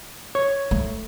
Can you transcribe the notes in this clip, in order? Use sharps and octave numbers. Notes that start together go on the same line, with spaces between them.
C#5
A3